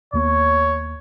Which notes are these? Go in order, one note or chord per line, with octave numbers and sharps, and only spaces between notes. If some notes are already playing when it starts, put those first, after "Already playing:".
D#2 A#3 B3 C#5